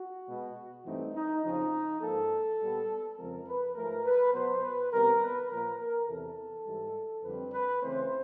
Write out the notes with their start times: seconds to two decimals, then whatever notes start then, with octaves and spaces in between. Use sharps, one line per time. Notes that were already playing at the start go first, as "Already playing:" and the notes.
Already playing: F#4
0.27 B2 G#3 B3
0.85 G2 E3 A3 C4 D#4
1.15 D#4
1.44 F2 C#3 F3 D#4
2.01 G#2 F3 A#3 A4
2.59 A#2 G3 B3
3.17 F2 C#3 F3 G#3 C4 A#4
3.47 B4
3.75 G#2 F3 A3 A#4
4.04 B4
4.34 B2 F#3 B3 C5
4.63 B4
4.91 C3 D#3 G3 B3 A#4
5.21 B4
5.49 A#2 F3 A#3 A#4
5.78 A#4
6.07 E2 C3 E3 A4
6.66 G#2 E3 G3
7.23 F2 D3 G3 C4 B4
7.52 B4
7.82 C#3 E3 A3 C4 C5